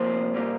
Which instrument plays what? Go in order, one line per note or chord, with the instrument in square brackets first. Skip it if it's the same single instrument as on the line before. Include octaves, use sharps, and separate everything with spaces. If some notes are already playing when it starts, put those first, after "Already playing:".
Already playing: [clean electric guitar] F2 C3 F3 A#3 C5
A#2 G3 A#3